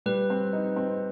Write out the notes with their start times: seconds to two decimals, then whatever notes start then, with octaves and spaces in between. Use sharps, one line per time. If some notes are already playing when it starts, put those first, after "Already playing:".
0.06 G3 B4
0.30 C4
0.53 D#4
0.76 C4